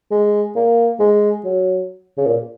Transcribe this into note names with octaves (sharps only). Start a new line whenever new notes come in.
G#3
A#3
G#3
F#3
C#3
A#2